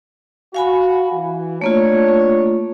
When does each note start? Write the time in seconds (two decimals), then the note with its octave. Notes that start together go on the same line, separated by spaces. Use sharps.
0.54 F#4 F5 G#5 B5
1.12 E3
1.61 A3 A#3 D4 F4 C#5